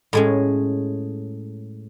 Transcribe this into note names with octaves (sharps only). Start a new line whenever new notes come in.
A2 G#3 C#4